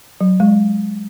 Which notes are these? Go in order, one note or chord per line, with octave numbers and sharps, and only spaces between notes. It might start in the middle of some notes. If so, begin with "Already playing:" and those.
F#3
G#3